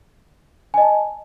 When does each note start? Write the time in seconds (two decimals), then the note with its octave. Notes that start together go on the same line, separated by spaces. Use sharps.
0.74 G#5
0.78 D#5
0.81 A5